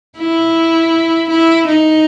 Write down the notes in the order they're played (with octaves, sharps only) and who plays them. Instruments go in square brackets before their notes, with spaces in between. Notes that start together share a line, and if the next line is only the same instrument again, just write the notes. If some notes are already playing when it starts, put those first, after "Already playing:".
[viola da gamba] E4
E4
D#4